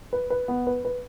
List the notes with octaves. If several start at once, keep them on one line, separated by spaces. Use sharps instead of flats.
B4
B4
B3
B4
B4